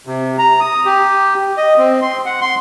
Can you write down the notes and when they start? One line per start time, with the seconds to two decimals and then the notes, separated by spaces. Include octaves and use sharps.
0.07 C3
0.39 A#5
0.60 D#6
0.85 G4
1.57 D#5
1.78 C4
2.02 C6
2.26 F#5
2.41 C6